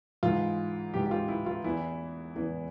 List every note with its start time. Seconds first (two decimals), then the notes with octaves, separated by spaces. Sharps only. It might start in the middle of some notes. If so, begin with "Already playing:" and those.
0.23 G#2 E3 F4
0.94 G#2 E3 G4
1.06 G4
1.11 F4
1.28 E4
1.46 F4
1.64 E2 E3 E4
2.36 E2 E3